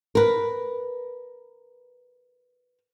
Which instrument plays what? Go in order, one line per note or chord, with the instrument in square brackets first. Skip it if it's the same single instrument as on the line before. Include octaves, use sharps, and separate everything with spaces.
[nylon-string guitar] A#4 B4